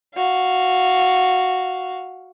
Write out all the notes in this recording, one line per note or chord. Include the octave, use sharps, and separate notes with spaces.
F#4 F5